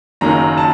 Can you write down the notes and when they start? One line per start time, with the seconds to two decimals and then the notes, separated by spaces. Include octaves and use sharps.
0.21 F#1 F#2 D#3 F#3 A#3 A#5
0.58 A5